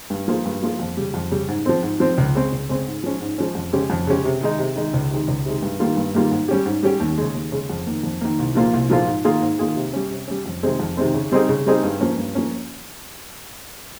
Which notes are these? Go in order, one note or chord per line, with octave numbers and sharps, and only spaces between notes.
G2
F3 A#3 F4 G#4
G2
F3 A#3 F4 G#4
F2
C#3 G3
F2
C#3 G3
G#2
F3 C4
G#2
F3 C4
C#2
C#3 G#3 C4
C#2
C#3 G#3 C4
G#2
F3 G#3 C#4
G#2
F3 G#3 C#4
F2
C#3 G#3 C#4 G4
F2
C#3 G#3 C#4 G4
C3
D#3 G#3 D#4
C3
D#3 G#3 D#4
C#2
C3 D#3 G#3
C#2
C3 D#3 G#3
G2
D#3 G3 A#3 F4
G2
D#3 G3 A#3 F4
G#2
G3 C#4 G4
G#2
G3 C#4 G4
D#2
C#3 G#3
D#2
C#3 G#3
F2
D#3 A#3
F2
D#3 A#3
C2
A#2 F3 A#3 F4
C2
A#2 F3 A#3 F4
G#2
D#3 A#3 F4 G#4
G#2
D#3 A#3 F4 G#4
C3
G3 C#4
C3
G3 C#4
F2
C3 D#3 G#3 C4
F2
C3 D#3 G#3 C4
C#3
G3 C4 D#4 G#4
C#3
G3 C4 D#4 G#4
G2
F3 A#3 C#4
G2
F3 A#3 C#4